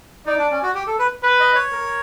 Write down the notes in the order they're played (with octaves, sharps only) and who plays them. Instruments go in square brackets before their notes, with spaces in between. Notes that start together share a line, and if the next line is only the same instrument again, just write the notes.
[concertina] D#4 [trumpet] D5
[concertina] D4
C#4
F#4
G4
A4
B4
[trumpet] B4
[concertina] D#5
C#5
[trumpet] A#4